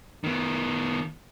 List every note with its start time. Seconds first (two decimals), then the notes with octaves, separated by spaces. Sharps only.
0.24 D#3 B3